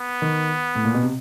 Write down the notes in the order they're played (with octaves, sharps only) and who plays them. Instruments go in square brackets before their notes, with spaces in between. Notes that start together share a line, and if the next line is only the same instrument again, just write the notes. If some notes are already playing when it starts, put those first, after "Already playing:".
Already playing: [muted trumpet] B3
[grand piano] D#3
A2
A#2
B2
C3